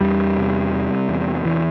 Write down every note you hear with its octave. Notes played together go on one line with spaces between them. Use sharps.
E2 G3
C3
C3
E2
E2 E3